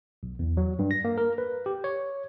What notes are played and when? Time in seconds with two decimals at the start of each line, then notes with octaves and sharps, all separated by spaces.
0.23 B1
0.39 E2
0.57 F#3
0.79 G2
0.91 A#6
1.04 A#3
1.18 A#4
1.38 B4
1.66 G4
1.84 C#5